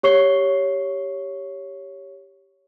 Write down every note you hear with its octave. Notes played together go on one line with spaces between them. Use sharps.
G4 C#5 C#6 C7 G7